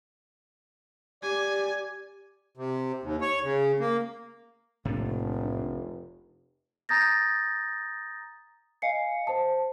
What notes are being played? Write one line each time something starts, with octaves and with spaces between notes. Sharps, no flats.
G4 D5 G#5
C3
D#2
C#5
C#3
A#3
F1 B1 A2 C3 A3 A#3 D4
A#5 D#6 G6 A6 A#6
D#5 F5 G#5 C7 C#7
C5 A5